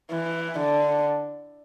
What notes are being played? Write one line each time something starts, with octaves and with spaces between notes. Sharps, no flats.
E3
D3